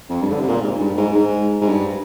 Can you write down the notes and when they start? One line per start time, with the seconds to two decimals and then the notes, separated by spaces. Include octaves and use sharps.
0.09 F2
0.22 G2
0.32 D3
0.40 C3
0.49 A#2
0.62 G#2
0.80 G2
0.97 G#2
1.15 G#2
1.61 G#2
1.69 G2